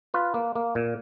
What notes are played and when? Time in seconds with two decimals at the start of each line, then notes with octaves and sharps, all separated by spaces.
0.14 F4 B4
0.34 A#3
0.55 A#3
0.75 A#2